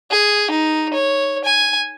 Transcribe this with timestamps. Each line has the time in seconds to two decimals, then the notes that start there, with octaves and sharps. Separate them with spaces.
0.11 G#4
0.51 D#4
0.94 C#5
1.44 G#5